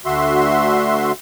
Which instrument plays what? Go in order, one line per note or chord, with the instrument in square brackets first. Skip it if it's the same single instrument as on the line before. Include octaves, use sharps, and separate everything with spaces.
[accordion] D2 D3 F#4 E5 C6